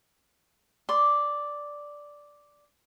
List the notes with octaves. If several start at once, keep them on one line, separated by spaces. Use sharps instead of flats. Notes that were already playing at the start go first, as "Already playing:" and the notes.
D5 C6